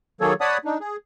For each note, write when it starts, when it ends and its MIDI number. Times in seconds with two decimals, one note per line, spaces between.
0.21 0.33 51
0.21 0.33 54
0.21 0.33 58
0.21 0.33 68
0.21 0.33 69
0.21 0.33 73
0.41 0.58 73
0.41 0.58 74
0.41 0.58 78
0.41 0.58 81
0.41 0.58 83
0.41 0.58 87
0.65 0.78 62
0.65 0.78 63
0.80 0.96 68